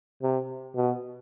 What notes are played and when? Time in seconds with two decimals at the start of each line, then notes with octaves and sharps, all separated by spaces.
0.23 C3
0.75 B2